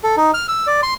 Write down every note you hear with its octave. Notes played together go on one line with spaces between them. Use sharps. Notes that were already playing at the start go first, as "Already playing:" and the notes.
A4
D#4
F6
E6
D5
C6